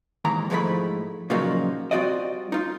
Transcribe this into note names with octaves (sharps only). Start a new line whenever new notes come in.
D#2 G#2 E3 A#5
G#2 F3 G#3 A3 E4 B5
A#2 C#3 F3 F#3 A#3 D#4
G3 C4 F4 F#4 D5 D#5
D#4 F4